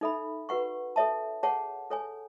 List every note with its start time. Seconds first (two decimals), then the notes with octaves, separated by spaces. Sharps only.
0.01 D#4 A4 E5 B5
0.49 F#4 B4 F#5 C#6
0.96 A4 C#5 E5 A5
1.43 G#4 C#5 F#5 A5
1.90 A4 C#5 G#5